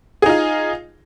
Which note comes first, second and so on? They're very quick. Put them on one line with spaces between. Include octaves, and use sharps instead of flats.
G#4 D#4 F4